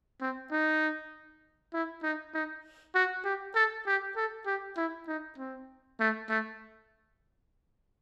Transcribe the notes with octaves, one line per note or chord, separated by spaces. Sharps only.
C4
D#4
E4
D#4
D#4
F#4
G4
A4
G4
A4
G4
E4
D#4
C4
A3
A3